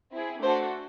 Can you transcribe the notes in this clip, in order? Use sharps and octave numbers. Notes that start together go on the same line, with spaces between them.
C4 E4 G#4
A3 D4 F#4 A4 C5